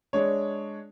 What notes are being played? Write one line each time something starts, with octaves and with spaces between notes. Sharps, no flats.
G#3 D4 C#5